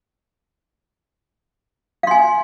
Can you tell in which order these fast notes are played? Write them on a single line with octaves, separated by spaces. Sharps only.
F5 C6 G#5